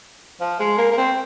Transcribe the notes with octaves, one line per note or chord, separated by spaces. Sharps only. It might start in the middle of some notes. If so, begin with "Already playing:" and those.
F3
G#3
A#3
A#3
C4